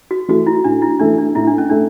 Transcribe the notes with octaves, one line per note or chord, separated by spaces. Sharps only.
F#4
E3 A3 F#4
E4
A2 D4
E4
E3 A3 D4
D4
A2 E4
D4
C#4
A3 D4